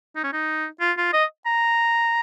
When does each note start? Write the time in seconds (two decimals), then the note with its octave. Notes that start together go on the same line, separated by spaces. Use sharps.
0.16 D#4
0.24 C#4
0.33 D#4
0.81 F4
0.98 F4
1.13 D#5
1.46 A#5